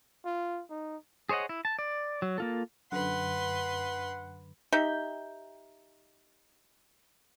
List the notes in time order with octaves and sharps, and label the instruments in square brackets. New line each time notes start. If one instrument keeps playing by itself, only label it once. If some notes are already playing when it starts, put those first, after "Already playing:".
[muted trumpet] F4
D#4
[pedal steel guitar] G#4 C5 C#5 D#5 F#5
E4
A5
D5
F#3
A#3 F4 A4
[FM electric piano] F#2 D3 [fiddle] B4 C6 [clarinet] F#5
[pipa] D#4 G4 E5 G5